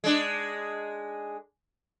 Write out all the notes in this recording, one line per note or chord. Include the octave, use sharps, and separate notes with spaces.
G#3 D4